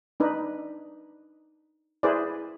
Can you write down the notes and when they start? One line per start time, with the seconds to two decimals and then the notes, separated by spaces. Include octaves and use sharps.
0.20 D4 D#4 B4
2.03 E4 G#4 B4 C5 D5